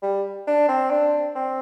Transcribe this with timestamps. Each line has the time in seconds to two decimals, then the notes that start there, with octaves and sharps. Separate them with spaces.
0.02 G3
0.47 D4
0.68 C4
0.90 D4
1.35 C4